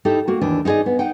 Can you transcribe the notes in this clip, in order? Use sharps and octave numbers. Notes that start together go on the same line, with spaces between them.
D#4 E4 G4 A4
A#3 F#4
D#2 E3 D4
D#4 E4 G#4 D5 D#5
B3
D#4 F#5 G5